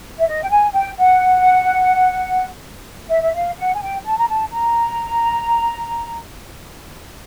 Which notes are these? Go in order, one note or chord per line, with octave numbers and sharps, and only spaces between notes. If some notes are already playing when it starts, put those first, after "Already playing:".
E5
D#5
G5
G#5
G5
F#5
E5
E5
F5
F#5
G#5
G5
A5
A#5
A5
A#5